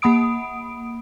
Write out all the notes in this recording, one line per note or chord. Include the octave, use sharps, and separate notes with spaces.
A#3 F#5 B5 D#6 D7